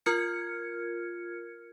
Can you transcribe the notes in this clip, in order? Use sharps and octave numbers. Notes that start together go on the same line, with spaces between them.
F4 A#4 F6 G#6 C#7